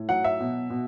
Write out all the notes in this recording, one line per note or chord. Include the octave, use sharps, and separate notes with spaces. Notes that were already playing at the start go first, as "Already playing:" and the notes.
Already playing: A2
F#3 F#5
E5
B2
B2